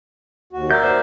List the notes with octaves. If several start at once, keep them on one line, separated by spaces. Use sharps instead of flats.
D#2 F#4
A#4 D5 E5 G6
C5